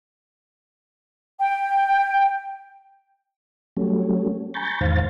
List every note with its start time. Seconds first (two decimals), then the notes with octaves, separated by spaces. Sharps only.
1.39 G5
3.77 F#3 G3 A3 C#4
4.54 G#5 A#5 B5 C#6 G6 A6
4.81 E2 G#2 D#3 C5 F5 A6